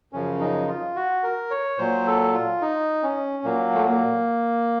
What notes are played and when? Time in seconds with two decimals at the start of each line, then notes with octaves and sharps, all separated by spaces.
0.13 F#2 C#3 F3 C#4
0.40 D#4
0.68 F4
0.96 F#4
1.23 A#4
1.51 C#5
1.78 A#2 F#3 C5
2.06 A4
2.34 F4
2.62 D#4
3.03 C#4
3.44 A#2 F#3 A#3
3.74 A3
3.86 A#3